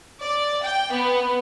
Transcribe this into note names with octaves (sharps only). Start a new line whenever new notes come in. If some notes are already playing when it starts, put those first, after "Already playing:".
D5
G5
B3